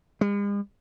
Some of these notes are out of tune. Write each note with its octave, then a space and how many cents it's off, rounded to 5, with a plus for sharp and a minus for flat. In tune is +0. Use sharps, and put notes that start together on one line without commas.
G#3 -45